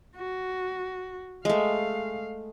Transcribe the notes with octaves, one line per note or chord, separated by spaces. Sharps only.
F#4
G#3 A3 F5